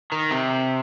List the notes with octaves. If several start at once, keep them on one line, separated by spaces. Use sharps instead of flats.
D#3
C3